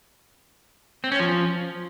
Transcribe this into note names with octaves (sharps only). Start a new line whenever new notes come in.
C4
C#4
F3